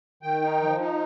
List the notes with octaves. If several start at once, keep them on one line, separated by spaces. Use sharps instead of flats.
D#3 G5
D#4
F3
D#4